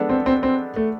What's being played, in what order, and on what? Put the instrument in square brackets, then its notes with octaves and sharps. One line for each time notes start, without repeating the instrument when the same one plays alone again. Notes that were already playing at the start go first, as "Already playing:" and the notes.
Already playing: [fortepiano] G#3 B3 D4 A4
[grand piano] C4
C4
C4
A3